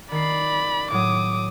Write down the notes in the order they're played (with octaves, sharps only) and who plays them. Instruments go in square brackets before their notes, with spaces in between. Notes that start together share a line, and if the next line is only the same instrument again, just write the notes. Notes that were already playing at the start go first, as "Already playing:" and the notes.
[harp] D#3 C7 [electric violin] D5 B5
[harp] A2 F#3 [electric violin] D6 D#6